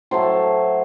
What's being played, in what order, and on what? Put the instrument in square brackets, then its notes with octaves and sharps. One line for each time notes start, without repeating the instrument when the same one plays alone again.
[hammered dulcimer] A2 F#3 A3 C5